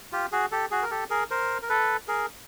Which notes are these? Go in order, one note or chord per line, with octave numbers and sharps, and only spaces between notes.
F4 G4
F#4 G#4
G4 A4
F#4 G#4
A#4
G4 A4
G#4 A#4
A#4 C5
A#4
A4 B4
G#4 A#4